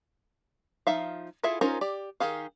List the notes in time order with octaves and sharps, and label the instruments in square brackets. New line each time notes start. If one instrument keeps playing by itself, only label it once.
[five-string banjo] F3 D#4 E5 F5
E4 F4 G#4 A4 E5
C#4 D#4 F4 A#4 C5
G4 D5
D#3 G4 G#4 F5